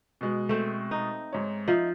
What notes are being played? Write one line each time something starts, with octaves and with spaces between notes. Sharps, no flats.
B2 G#3
A3 C4
D#4
G#2 C#5
F3 D#4 E5